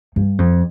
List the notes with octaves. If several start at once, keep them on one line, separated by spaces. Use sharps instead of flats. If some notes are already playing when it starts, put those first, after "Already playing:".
G2
F2